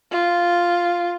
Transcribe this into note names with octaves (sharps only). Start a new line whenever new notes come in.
F4